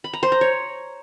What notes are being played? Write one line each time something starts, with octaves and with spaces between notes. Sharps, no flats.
B5
A#5
C5
A#5
C#5